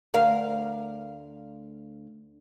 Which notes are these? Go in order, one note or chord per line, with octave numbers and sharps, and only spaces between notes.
D2 A#4 F5